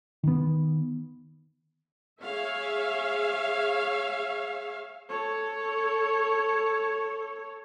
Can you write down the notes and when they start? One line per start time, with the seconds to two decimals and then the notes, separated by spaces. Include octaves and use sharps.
0.23 D#3 B3
2.22 G#4 C#5 E5 F5
5.09 A4 C#5